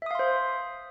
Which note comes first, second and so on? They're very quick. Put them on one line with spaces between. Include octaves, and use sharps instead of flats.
E5 D#6 F5 C6 C5